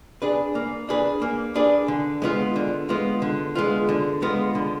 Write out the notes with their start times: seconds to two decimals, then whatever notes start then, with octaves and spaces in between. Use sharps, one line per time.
0.22 D4 G#4 B4
0.55 A#3
0.89 D4 G#4 B4
1.22 A#3
1.56 D4 G#4 B4
1.88 D3
2.22 G#3 B3 F4
2.56 D3
2.89 G#3 B3 F4
3.22 D3
3.55 G#3 B3 F4
3.89 D3
4.22 G#3 B3 F4
4.55 D3